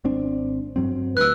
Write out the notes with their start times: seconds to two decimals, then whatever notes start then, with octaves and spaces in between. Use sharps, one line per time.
0.04 G#1 C4 D4
0.76 G2 F#3 C4
1.17 D2 G2 B4 E6 F#6